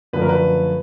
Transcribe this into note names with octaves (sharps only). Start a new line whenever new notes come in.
F#2 D3 F3 A3 B4
A#4
B4